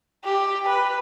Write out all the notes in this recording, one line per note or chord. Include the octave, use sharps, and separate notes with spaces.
G4
B4